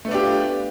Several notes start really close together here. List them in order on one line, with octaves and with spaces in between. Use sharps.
A3 B3 D4 G4 F4